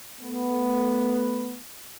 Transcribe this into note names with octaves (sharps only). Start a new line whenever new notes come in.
A3 B3